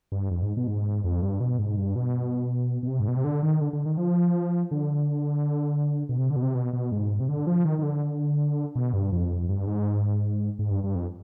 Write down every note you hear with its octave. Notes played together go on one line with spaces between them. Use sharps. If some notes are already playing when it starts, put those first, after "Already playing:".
G2
F2
G#2
B2
G#2
F2
G2
B2
G#2
G2
B2
B2
C3
G#2
B2
C3
D3
D#3
D3
D3
D#3
F3
D3
B2
C3
D3
B2
C3
B2
B2
G#2
C3
D3
F3
D#3
D#3
D3
B2
G2
F2
G2
G#2
G#2
G2
G2
F2